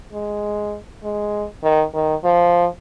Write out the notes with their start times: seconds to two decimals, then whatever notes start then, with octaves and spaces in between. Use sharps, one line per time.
0.12 G#3
1.03 G#3
1.63 D#3
1.94 D#3
2.24 F3